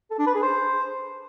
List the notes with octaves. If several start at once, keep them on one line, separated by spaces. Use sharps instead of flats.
A4
D4
B4
G#4
C5